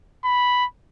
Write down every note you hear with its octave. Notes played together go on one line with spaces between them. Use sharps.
B5